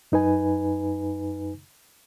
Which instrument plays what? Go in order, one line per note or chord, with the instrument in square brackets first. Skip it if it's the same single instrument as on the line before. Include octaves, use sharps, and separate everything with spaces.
[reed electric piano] F#2 D#4 B4 G#5